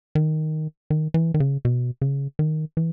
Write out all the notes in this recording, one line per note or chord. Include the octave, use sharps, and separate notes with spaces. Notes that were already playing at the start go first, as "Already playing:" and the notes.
D#3
D#3
E3
D#3
C#3
B2
C#3
D#3
E3